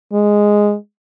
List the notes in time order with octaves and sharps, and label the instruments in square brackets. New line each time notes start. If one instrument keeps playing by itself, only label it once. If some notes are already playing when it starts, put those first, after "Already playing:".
[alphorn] G#3